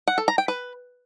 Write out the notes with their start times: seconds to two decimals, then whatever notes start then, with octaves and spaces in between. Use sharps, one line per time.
0.07 F#5
0.18 A4
0.28 A#5
0.38 G5
0.48 B4